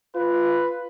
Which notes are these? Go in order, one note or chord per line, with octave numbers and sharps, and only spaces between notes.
F4 B4